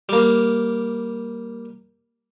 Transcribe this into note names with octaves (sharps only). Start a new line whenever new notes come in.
G3 A#3